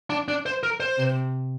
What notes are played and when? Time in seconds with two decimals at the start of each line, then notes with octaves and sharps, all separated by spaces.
0.10 D4
0.28 D4
0.46 C5
0.63 A#4
0.80 C5
0.98 C3